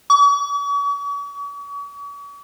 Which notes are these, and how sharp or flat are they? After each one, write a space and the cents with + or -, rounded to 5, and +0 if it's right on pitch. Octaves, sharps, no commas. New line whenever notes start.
C#6 +45